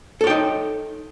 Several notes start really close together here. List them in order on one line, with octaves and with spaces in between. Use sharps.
A4 C#5 G5 D#4